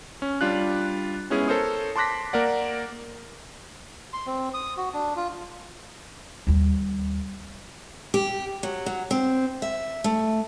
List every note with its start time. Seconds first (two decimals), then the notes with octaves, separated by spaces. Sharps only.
0.22 C#4
0.41 G3 D4 F4 F#6
1.30 G#3 B3 C#4 E4 G#4
1.48 A4 A#4 C5 C#5 D#6
1.96 A5 C6 D6 F#6 A#6 B6
2.33 A#3 A#4 D5 F#5
4.13 C6
4.26 C4
4.54 D#6
4.77 F#4
4.94 D4
5.16 F4
6.47 D#2 G3
8.14 G4
8.63 F#3
8.86 F#3
9.11 C4
9.62 E5
10.04 A3